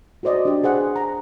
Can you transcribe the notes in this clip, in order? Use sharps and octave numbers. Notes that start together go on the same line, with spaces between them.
F#4 A4 C5 D5 D#5
D4 G4
G#4 C5 F#5
A#5